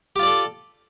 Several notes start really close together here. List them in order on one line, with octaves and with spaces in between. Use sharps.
G4 F4 D5 A4